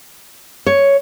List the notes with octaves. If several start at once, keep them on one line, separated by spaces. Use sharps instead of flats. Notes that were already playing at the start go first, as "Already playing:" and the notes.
C#5